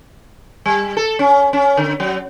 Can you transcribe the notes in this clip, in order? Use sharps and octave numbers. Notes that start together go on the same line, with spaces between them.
G3
A4
C#4
C#4
D3
F#3